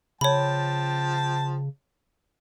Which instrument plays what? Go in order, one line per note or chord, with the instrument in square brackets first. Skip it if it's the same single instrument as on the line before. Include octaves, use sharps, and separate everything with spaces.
[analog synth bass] C#3 [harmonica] F3 G5 A5 [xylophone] C#5 B5